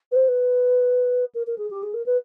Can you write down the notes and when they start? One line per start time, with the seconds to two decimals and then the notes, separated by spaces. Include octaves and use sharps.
0.11 B4
0.15 C5
0.28 B4
1.34 A#4
1.46 A#4
1.58 G#4
1.70 G4
1.82 G#4
1.93 A#4
2.06 B4